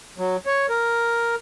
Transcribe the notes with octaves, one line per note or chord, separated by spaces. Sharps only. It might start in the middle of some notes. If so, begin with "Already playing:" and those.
F#3
C#5
A#4